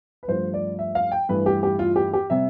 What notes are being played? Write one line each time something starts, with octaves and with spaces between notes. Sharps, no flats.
B4
G2 F3 A3 C5
D5
E5
F5
G5
G2 E3 A3 B4
G4
G4
F4
G4
G4
C3 G3 E5